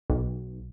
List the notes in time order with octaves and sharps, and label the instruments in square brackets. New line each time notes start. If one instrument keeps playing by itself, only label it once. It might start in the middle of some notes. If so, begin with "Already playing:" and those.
[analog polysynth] B1